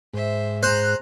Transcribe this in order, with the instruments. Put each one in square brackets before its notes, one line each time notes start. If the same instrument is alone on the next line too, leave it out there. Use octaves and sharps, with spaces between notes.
[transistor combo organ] G#2 [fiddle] C5 E5
[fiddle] G#4 A#5 [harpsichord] C5 [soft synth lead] F#6